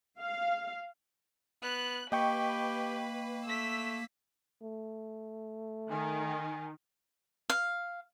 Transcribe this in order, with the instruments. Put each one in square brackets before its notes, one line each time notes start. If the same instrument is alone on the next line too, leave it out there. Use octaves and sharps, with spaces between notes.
[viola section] F5
[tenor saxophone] B3 [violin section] F#6
[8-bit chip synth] A#3 [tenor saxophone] G4 [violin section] B4 [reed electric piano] D#5 G5 C#6
[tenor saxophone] A3 [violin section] E6 B6
[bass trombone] A3
[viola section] D#3 [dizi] G#5
[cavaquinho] F5